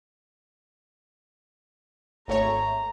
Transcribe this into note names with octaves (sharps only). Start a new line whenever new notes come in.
G#1 A3 C#5 A#5